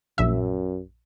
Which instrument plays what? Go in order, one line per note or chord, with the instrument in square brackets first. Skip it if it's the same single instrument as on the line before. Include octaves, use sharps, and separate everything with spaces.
[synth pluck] A#1 E5 [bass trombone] F#2